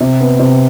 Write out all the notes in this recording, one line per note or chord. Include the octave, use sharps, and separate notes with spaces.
C3
B3
C3